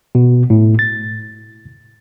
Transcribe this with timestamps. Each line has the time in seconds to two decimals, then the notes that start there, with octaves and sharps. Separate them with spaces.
0.15 B2
0.50 A2
0.79 A6